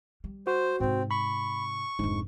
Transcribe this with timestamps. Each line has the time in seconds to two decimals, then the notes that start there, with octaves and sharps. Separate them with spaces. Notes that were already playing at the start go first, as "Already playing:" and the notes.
0.24 G3
0.47 F#4 C5
0.80 G#2 C3 C4
1.11 B5 C#6
1.99 F1 G#2 D4